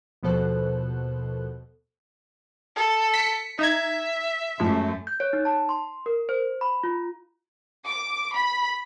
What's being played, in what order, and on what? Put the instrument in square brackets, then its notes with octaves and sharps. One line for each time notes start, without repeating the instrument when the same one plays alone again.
[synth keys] D#2 B2 F3 A4 C5 F#6
[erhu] A4
[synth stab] B6 C#7
[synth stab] D#4 A#5 G#6 [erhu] E5
[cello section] F#2 A3 [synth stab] A2 F3 G#3
[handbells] G6
C#5
D#4
A5
C6
A#4
C5
B5
F4
[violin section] D6
B5